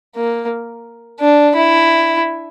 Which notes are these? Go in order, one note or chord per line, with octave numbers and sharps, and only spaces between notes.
A#3
D4
E4